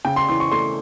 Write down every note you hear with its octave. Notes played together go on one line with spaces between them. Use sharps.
C#3 G5
C6
E3 C6
C#6
A3 C6